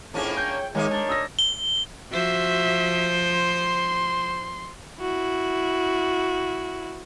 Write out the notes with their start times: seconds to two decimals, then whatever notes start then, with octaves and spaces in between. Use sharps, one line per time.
0.14 F2 A2 A#3 C#4 D4 E4 F4 G#4
0.37 C#5 G5 G6
0.75 D#3 G#3 A#3 D#4 G#4 A#4 C#5 D#5
0.91 D4 A5
1.09 D#6 E6 A#6
1.39 G7
2.12 F3 F#4 C5 E5
3.35 C6
5.00 E4 F#4